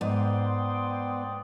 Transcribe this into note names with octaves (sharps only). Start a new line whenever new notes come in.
G#2 B3 D5 G5 C6 D#6